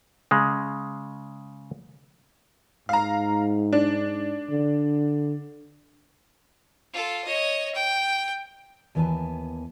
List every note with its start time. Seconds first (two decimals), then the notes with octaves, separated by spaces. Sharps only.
0.31 C#3 G#3
2.89 G#2 F5 A#5
3.73 D4
4.51 D3
6.94 F4 A4
7.24 C#5 D#5
7.74 G5
8.95 D#2 E3 B3 B4 G#5 A5